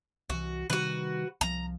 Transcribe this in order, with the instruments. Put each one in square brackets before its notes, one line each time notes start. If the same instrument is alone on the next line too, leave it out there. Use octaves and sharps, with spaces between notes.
[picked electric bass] C2 E3 [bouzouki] F#4
[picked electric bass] C3 D#3 G3 [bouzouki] F#4 B4
[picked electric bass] C2 F3 [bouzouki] A#5